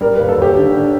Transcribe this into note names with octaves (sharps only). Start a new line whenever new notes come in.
G3 A#4
D#2 B4
A4
D#2 G4
D3
D3